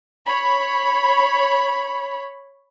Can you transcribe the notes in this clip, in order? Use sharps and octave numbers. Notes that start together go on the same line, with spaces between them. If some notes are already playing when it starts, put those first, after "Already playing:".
C#5 B5